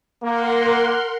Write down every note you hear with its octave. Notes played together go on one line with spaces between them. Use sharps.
A#3 A#4 F#5 C6